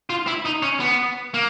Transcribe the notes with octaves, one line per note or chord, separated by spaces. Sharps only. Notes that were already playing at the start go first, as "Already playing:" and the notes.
F4
E4
D#4
C#4
B3
A#3